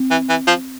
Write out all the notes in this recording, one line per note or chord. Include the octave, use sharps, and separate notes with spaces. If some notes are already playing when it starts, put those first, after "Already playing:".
Already playing: C4
E3
E3
F3